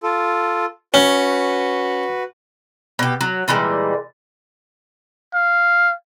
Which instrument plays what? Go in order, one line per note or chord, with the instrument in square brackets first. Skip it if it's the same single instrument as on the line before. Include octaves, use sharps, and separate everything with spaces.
[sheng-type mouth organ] F4 A4
[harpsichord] C#4 [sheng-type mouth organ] F#4 B4
[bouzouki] B2 G4
F#3
A#2 E3 G3 G#3
[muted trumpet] F5